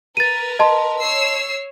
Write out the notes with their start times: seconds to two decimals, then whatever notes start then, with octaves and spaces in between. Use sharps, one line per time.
0.17 A#4 B4 A6 D#7
0.59 D#5 A5 C6
1.01 C#5 E6 C7